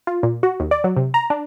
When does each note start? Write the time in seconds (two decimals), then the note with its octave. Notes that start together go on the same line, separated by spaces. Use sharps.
0.07 F4
0.23 A#2
0.43 F#4
0.60 D#2
0.71 D5
0.84 F#3
0.97 C3
1.14 A#5
1.30 D4